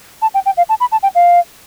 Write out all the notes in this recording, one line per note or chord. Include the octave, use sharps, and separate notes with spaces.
A5
G5
G5
F5
A5
B5
A5
G5
F5